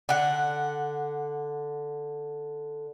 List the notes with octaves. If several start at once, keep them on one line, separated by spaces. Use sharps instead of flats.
D3 F#5